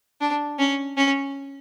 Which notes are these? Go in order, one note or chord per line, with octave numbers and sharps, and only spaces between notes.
D4
C#4
C#4